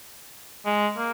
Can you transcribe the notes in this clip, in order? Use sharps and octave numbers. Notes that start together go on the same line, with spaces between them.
G#3
A#3